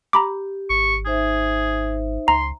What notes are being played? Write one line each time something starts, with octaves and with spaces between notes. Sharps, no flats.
G4 A#5 B5 D6
G#1 C#6
D#4 G#4 C5 E5
C#2 A#5 C6